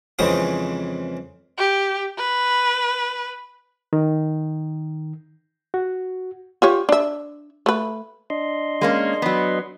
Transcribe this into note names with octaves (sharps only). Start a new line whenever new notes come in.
F2 C#3 E3 G#3 C4 D#6
G4
B4
D#3
F#4
F4 G4 C#5
D4 E5
A3 B4
D4 D#5 C6
G#3 A#3 C#4
F#3 B3